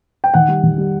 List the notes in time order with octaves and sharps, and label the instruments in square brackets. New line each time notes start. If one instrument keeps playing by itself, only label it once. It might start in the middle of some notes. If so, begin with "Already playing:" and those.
[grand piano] G5
D#3 F#5
G3
D#3
G3